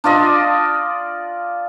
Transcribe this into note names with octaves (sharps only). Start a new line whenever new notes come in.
D4 F4 D5 D#5